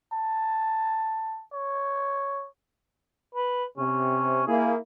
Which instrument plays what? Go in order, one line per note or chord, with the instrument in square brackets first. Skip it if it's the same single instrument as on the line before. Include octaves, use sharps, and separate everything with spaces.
[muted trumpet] A5
C#5
[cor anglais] B4
[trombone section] C3 [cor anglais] C#4
[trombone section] A#3 E4 [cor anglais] G#4